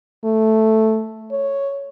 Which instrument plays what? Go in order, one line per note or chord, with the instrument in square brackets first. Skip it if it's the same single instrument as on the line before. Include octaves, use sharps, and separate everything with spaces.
[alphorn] A3
C#5